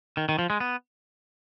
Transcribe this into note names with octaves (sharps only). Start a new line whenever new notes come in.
D#3
D#3
F3
G#3
B3